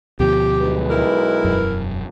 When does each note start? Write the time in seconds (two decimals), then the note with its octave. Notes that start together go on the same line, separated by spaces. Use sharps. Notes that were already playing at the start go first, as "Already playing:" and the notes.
0.20 D2 B2 F3 G4
0.59 B1 G#3 B4
0.90 E4 A#4
1.45 E1 F#2